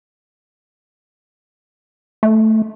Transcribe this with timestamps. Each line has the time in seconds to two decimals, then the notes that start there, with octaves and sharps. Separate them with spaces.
2.23 A3